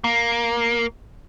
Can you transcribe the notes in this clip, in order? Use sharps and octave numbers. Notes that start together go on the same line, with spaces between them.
A#3